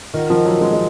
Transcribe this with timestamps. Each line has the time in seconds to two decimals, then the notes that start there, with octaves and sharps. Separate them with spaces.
0.14 D#3 F4 A#4 D#5 F#5
0.30 F3
0.45 F#3
0.61 G#3
0.72 G#3